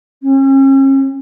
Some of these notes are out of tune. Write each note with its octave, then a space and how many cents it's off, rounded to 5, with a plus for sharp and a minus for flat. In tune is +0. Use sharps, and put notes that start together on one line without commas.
C#4 -40